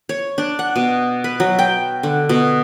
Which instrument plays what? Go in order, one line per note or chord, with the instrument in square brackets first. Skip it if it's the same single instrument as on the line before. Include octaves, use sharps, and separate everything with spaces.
[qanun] C#5
D4
F#5
B2
B4
F#3
G5
D3
B2